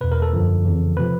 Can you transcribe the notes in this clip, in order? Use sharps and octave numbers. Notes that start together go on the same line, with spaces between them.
E2 B2 B4
A#4
A4
F#2 D3 F3
F2 C#3 E3
C3 F3 B4